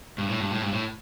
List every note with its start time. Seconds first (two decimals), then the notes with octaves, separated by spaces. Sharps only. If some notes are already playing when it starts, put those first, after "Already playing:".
0.18 G2
0.29 A2
0.40 G2
0.51 A2
0.62 G2
0.72 A2